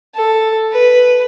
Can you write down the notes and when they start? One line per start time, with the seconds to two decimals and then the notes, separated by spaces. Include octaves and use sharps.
0.15 A4
0.73 B4